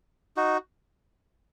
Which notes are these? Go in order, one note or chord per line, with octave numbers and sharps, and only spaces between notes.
D#4 F#4